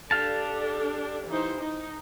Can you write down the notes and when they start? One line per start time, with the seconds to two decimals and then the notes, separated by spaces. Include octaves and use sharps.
0.11 D4 G4 A4 F5 A5
1.28 E3 D#4 C5
1.60 D#4